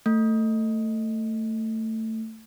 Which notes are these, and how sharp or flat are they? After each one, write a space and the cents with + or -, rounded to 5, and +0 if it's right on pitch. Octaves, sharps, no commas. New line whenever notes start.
A3 +15